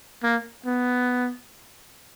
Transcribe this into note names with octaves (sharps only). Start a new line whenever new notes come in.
A#3
B3